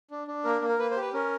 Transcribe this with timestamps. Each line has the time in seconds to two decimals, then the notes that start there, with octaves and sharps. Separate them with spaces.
0.11 D4
0.27 D4
0.44 A#3 A#4
0.62 A#3
0.69 A#4
0.79 A#3 B4
0.91 C5
0.96 G4
1.02 B4
1.13 C#4 A#4